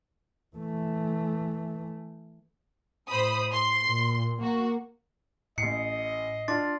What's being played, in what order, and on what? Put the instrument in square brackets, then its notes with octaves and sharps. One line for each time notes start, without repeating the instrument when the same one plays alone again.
[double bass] E3 A3
[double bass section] A2 [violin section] C5 B5 D#6
[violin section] C6
[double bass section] A#2
[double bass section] A#3 [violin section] F#4
[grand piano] A1 C#7 [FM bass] A2 [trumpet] D#5 [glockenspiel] C7
[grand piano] D4 F4 [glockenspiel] C6 A6